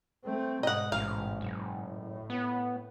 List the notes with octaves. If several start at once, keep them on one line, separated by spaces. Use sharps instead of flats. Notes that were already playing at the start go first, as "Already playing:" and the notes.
A3 C4
G#2 B2 D#5 F#5
A1 F5
F#1
A2
B3